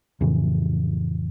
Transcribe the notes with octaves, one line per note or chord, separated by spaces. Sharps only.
F2 A2 C#3 E3